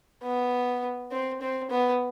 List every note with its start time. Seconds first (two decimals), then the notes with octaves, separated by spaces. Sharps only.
0.23 B3
1.11 C4
1.41 C4
1.70 B3